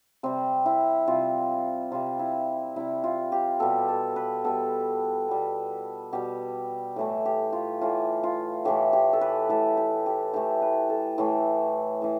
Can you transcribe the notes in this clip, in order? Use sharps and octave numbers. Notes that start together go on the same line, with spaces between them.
C3 G3 C4
E4
C3 G3 F4
C3 G3 F4
E4
C3 G3 E4
F4
G4
B2 G3 A4
A4
B4
B2 G3 A4
B2 G3
B2 G3 G4
A2 E3 A3
G4
F4
A2 E3 A3 F4
F4
A2 E3 A3 G4
G4
A4
B4
A2 E3 A3 A4
G4
G4
A2 E3 A3 G4
B4
A4
A2 E3 A3
A2 E3